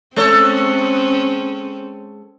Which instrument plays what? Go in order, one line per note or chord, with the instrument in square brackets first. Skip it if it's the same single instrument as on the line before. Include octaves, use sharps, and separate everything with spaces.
[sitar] G#3 A4 C#5 [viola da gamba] C4 C#4